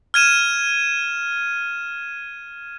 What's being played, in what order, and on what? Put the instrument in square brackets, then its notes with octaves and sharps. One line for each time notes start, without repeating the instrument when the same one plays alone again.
[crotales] F6 G#6 D#7 E7